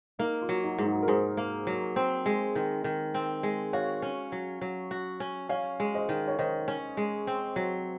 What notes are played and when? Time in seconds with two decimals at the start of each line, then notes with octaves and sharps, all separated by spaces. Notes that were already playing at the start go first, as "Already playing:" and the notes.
0.19 A#3 D#4
0.42 F4
0.49 F#3
0.63 D#4 F#4
0.78 G#2
0.85 D#4 F#4
1.03 A#4
1.08 G#2 G#4 C5
1.37 A#3
1.67 F#3
1.96 C4
2.26 G#3
2.55 D#3
2.84 D#3
3.15 C4
3.43 G#3
3.73 F#4 C#5 F5
4.02 C#4
4.32 F#3
4.61 F#3
4.91 F#4
5.20 C#4
5.49 C#4 C#5 F5
5.80 G#3
5.95 C5 D#5
6.09 D#3
6.28 C#5
6.38 D#3 C5 D#5
6.68 C#4
6.97 G#3
7.27 C4
7.56 F#3